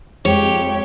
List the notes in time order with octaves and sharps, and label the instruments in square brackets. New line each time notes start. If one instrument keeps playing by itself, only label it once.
[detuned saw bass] F2 [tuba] G#3 [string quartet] G4 [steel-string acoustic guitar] C#5